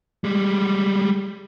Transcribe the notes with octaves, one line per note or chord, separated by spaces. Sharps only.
G3 G#3